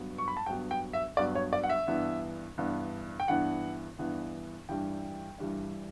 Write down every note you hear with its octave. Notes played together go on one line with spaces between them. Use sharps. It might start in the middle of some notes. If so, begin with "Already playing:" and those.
Already playing: G2 F#3 B3
C#6
B5
A5
G2 F#3 B3 G5
G5
E5
G2 F#3 B3 D5
C#5
D5
F#5
E5
G2 E3 B3 D4
G2 E3 B3 D4
G5
G2 E3 B3 D4 F#5
G2 E3 B3 D4
G2 E3 G3 D4 G5
G2 E3 G3 D4